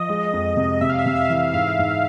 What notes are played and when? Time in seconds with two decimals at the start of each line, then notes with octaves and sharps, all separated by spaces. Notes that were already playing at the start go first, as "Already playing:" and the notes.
Already playing: F3 D#5
0.09 G#3
0.33 F2
0.57 C3
0.81 C3 E5
0.89 F5
0.99 E5
1.06 C3 F5
1.16 E5
1.25 F5
1.29 E3 E5
1.53 G#2 F5
1.79 G#2